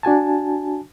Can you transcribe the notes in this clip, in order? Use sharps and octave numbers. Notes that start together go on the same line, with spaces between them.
D4 F#4 G#5 A5